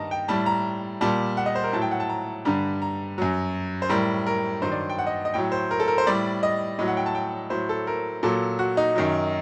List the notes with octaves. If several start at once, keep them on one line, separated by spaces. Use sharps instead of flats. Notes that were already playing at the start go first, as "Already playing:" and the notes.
Already playing: G2 D#3 G3 D#5 A5 A#5
G5
A2 G3 A5
A#5
A#2 G3 A5
F#5
D#5
C5
A#4
A2 F#3 A5
G5
F#5
A5
A#5
G2 D3 G3 A#5
A#5
F#2 F#3
C5
A2 G3 A#4
A#4
G2 D#3 F#3 C5
D5
G5
F#5
D#5
D#5
A2 F#3 G5
C5
A#4
A4
A#4
C5
A2 G3 D5
D#5
A2 F#3 D#5
F#5
G5
A5
G5
A2 F#3 C5
A4
A#4
A#2 F#3 A4
F#4
D#4
F#2 D#3 F#3